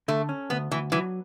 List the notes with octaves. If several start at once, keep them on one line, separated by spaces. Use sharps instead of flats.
D3 A3
C#4
D2 B3
D2 E3
E3 F#3